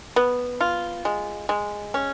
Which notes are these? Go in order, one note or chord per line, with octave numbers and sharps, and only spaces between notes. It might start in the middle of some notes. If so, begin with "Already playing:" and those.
B3
F4
G#3
G#3
C#4